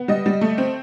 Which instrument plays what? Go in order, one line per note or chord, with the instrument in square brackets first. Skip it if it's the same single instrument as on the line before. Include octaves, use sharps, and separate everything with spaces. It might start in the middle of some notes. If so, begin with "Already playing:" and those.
Already playing: [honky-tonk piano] B3
G3 D#5
G3
A3
C4